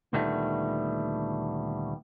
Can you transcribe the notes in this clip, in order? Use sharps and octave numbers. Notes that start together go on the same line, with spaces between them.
D2 A#2 D#3 G3 A3 B3